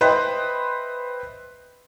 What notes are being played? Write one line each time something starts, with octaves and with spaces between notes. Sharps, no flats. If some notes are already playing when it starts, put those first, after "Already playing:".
B4 C5 D#5 E5 G5